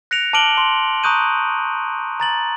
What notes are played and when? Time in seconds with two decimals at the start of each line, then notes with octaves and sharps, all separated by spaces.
0.11 F#6 A#6 C#7 D7 F7
0.33 A5 D6 F6 D7 F#7 G7
0.57 C6
1.03 A#5 C#6 D#6 F#6 G6 D#7
2.20 A#5 A6 F#7